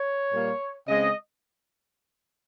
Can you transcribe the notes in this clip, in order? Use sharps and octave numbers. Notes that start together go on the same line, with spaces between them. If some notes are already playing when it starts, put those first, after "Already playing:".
Already playing: C#5
A#2 G3 A#3
C#3 G#3 C4 D#5